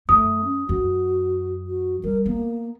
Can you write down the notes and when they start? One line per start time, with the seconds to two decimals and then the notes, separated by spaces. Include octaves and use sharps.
0.09 F#2 A3 D#6
0.44 C#4
0.69 F#2 F#4
1.67 F#4
2.04 G3 A#4
2.26 A#3 B3